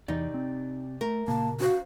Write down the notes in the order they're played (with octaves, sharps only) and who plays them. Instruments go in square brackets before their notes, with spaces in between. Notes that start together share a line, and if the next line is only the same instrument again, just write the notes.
[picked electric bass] E2 E3 [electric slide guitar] C3 G4 D5 [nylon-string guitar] D#4
[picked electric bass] C4
[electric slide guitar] A3 [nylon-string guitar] A#4
[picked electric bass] A#2 C#3 [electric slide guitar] A#3 [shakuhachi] A5
[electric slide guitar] C#4 C5 F5 [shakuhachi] F#4